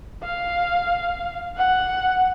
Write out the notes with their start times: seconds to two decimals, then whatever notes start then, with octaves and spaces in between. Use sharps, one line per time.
0.23 F5
1.58 F#5